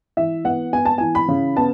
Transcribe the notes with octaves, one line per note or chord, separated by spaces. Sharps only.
E3 E5
B3 F#5
B3 G#5
A5
E3 G#5
B5
C#3
B3 A5